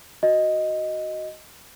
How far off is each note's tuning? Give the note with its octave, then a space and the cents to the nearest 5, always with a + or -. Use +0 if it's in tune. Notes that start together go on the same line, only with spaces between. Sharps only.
F#4 +0 D#5 +0